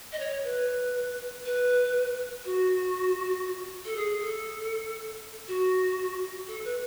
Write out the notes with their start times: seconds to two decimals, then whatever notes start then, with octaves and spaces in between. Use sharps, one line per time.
0.12 D#5
0.19 C#5
0.44 B4
1.45 B4
2.45 F#4
3.85 A4
3.96 G#4
4.21 A4
5.48 F#4
6.47 A4
6.64 B4